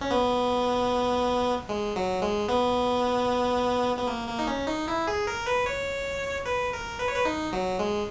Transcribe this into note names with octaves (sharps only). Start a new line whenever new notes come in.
C#4
B3
G#3
F#3
G#3
B3
B3
A#3
A#3
D#4
C#4
D#4
E4
G#4
A#4
B4
C#5
B4
A#4
B4
C#5
B4
D#4
F#3
G#3